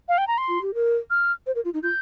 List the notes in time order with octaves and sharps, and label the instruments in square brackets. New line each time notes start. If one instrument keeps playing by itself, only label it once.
[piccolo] F5
G5
A#5
C6
[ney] F4
G4
A#4
[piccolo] F6
[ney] C5
A#4
F4
D#4
[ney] F4 [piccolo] G6